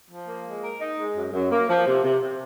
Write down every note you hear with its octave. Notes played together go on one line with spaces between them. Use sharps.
F3
A#3
G#3
A#4
D#4
G#3
F#2
F#2
A#3
F3
C3
C3
C3